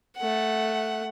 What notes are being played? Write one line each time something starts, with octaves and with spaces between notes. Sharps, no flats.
A3 F#5